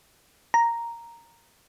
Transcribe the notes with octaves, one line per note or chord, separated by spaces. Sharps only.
A#5